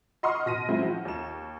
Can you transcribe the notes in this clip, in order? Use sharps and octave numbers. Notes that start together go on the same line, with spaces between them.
D#5 F#5 C6 C#6 D#6 F6
B2 A#6 D#7
F#3 G#3 C4 E4 F4
F3 F#4
D#2 E7